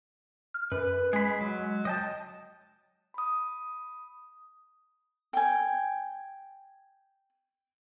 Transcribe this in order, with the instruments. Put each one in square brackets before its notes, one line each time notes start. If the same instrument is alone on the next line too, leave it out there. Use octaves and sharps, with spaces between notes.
[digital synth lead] F6
[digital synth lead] F#2 [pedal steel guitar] B4
[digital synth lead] G#3 [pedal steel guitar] G#4 B5
[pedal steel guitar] F#3
D#5 G5 A5
[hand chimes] B5 D#6
[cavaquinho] G5 G#5